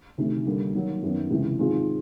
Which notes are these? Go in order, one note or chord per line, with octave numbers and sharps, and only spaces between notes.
D2 C3 D#3
D3 G3 A#3
D#3 F#3 A#3
F#2 D#3 F#3 B3
C#2 C3 E3
G#2 D#3 G#3 C4 F4